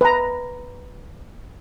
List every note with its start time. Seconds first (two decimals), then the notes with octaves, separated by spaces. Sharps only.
0.01 B4 A#5